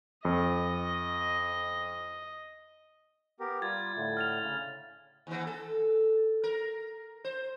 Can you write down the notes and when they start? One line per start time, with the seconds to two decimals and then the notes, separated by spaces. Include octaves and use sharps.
0.25 F2 D#5
3.40 B3 G4 A#4
3.62 G3 F4 G#6 A6
3.96 A2 D3 A3
4.17 F6 A6 F7
4.41 C#3
5.27 D#2 E3
5.47 A4
6.43 A#4
7.24 C5